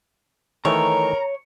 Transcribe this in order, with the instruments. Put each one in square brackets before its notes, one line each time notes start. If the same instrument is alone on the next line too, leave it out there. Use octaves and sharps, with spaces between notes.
[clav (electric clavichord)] D#3 E3 A3 [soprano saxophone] A#4 [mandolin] C#5 [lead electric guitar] A#5